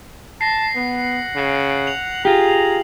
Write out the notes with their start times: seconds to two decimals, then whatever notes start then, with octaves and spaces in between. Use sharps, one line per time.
0.41 A5 A#6 C7
0.76 B3 F#5
1.36 C#3
1.87 F7 F#7
2.25 F4 G4 G#4 A#5